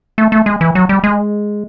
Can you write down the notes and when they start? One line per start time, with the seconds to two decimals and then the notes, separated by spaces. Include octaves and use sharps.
0.18 A3
0.32 A3
0.46 G#3
0.61 E3
0.75 F#3
0.89 G3
1.04 G#3